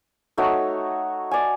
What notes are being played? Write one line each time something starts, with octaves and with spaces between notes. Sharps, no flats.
A3 D#4 F#4 C#5
D5 G#5